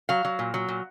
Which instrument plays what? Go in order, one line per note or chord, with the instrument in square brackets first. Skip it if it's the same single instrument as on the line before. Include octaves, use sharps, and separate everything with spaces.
[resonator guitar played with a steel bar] F#3 F5
F#3
A#2
F#3
A#2